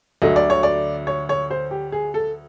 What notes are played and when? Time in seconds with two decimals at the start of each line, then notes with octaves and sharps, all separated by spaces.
0.22 D2 D3 F#3 A3 D#5
0.36 D5
0.50 C#5
0.63 D5
1.07 C#5
1.29 C#5
1.51 C5
1.71 G4
1.92 G#4
2.14 A4